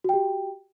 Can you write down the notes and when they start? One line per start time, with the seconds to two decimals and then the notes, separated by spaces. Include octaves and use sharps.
0.04 F#4
0.09 G5
0.14 G4